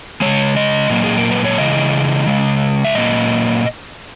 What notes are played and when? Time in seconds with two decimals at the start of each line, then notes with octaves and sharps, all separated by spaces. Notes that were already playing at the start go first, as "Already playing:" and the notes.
0.21 C#3 G#3 C#5
0.56 D#5
0.89 A#2 F#3 A#3
1.04 G#4
1.18 A#4
1.31 B4
1.45 C#5
1.58 C#3 E3 G#3 D#5
2.27 C#3 G#3
2.85 E5
2.95 A#2 F#3 A#3 D#5